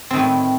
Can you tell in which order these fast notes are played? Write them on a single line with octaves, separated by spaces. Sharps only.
C4 D#3 A3 A2